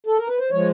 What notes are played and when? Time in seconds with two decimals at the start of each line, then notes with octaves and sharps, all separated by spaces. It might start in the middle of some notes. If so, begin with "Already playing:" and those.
0.06 A4
0.17 A#4
0.27 B4
0.39 C5
0.51 F3 G#3 C#5